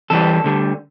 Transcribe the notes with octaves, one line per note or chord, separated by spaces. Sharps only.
E2 E3 G3 A4
D2 D3 G3